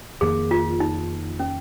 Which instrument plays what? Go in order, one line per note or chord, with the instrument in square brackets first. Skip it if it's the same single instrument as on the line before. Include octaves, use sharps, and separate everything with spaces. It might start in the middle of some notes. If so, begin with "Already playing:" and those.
[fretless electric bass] F2 D#3 A#3 [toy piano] G#4
[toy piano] F4
D#4
C#4